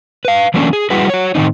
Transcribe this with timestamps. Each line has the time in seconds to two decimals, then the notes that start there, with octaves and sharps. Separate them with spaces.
0.25 B4 F5
0.54 E3 F#3 A3 A#3 C#4 D4
0.73 G#4
0.90 G3 E4 F#4 G#4 B4
1.09 F#4 C#5
1.35 A2 D#3 C4 D#4